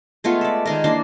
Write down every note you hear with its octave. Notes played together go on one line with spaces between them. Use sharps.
G#3 A3 B3 F4
D5 E5
D#3 G#3 A#4
E3 A#3 D4 C6